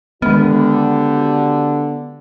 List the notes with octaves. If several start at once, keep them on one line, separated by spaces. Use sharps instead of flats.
D3 D#3 G#3 B3 F#4 G4